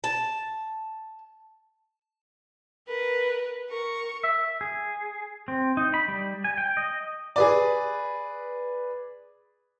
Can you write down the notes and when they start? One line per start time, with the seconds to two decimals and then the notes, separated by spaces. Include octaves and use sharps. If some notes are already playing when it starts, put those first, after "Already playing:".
0.04 A5
2.88 A#4 B4
3.69 A#4 C#6
4.23 E5
4.61 G#4
5.48 C4
5.77 D#4
5.94 B5
6.08 G3
6.44 G#5
6.58 G5
6.77 D#5
7.36 G#4 B4 D5